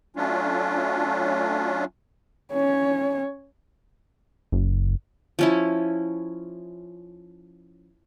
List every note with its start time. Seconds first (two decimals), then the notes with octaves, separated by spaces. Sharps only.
0.16 F#3 A3 C#4 D4 F4
2.52 C#4 C#5
4.52 F#1
5.39 F3 C#4 E4